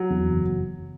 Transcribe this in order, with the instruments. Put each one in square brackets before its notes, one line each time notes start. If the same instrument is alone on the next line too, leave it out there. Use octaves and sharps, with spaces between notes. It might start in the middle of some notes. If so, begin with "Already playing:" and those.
Already playing: [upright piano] F#3
[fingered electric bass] E2
F#1